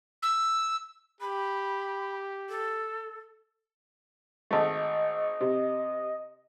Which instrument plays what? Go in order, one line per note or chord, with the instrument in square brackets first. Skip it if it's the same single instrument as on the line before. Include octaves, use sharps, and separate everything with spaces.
[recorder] E6
[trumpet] G4 [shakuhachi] B5
[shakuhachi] A4
[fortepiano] G#1 A3 [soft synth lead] D#5
[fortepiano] C3